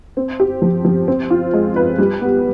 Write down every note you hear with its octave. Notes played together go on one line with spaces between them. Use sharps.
C4
G4
F3
F3
C4
F4
G#3
B4
G3
B3